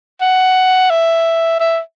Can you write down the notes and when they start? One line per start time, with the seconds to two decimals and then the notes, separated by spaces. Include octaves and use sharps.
0.21 F#5
0.90 E5
1.60 E5